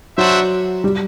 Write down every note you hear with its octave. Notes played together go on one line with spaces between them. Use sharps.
F#3 D4 F#4 C5 E5
G3